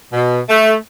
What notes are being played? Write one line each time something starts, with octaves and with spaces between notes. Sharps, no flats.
B2
A3